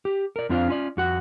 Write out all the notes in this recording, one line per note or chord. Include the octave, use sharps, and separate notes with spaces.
G4
A#4 D5
F2 C4 D4 F4 C5 F5
C#4 F4 D5
F2 F#4 F#5